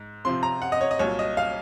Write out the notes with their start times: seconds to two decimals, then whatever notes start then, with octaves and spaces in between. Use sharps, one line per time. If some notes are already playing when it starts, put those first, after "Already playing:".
Already playing: G#2
0.25 C3 F3 C4 C6
0.43 A#5
0.62 F#5
0.72 D#5
0.81 C#5
0.91 D#5
0.99 C2 A#2 F#3 C#5
1.19 D#5
1.37 F5